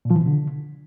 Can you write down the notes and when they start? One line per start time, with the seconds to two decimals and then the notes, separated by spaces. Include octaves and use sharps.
0.05 A#2
0.10 F3
0.16 E3
0.21 B2
0.26 D3